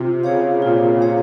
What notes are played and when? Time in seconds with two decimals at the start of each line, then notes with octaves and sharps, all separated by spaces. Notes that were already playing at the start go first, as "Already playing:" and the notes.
Already playing: C3 F4
0.24 C#3 G#4 C#5 F5
0.62 A#2 F4
1.02 G#4 C#5 F5